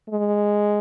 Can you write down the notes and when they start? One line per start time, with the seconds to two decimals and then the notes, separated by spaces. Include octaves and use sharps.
0.09 G#3